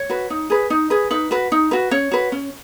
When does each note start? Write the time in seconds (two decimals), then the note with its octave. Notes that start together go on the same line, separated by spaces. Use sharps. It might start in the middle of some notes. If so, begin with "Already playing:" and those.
Already playing: C#5
0.10 F#4 B4
0.30 D#4
0.50 G#4 B4
0.70 D#4
0.90 G#4 B4
1.11 D#4 B4
1.31 F#4 B4
1.52 D#4
1.71 F#4 B4
1.91 C#4 C#5
2.12 F#4 B4
2.32 C#4